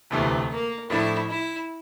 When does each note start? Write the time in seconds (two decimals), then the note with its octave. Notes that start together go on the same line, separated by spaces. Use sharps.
0.11 E1 D2 C3 E3 A3
0.51 A#3
0.90 A2 F3 A3 D4 E4
1.29 E4